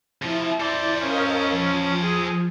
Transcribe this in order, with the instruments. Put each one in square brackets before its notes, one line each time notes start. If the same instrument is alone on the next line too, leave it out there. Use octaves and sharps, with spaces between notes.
[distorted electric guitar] C3 F3 [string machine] E4
[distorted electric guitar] A4 C5 [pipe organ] D5
[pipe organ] C#4 [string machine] A#4 D#5 F5
[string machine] F3
[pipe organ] G#4